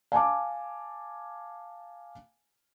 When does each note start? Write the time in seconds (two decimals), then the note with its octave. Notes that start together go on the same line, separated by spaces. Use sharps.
0.12 F5 G#5 A5 D6